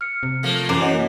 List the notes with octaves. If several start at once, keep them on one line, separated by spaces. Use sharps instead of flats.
F6 C#7
C3
F3 A3 A#3
F#2 E3 C5 D6
C#4 C#5 D#5 F#5
A#3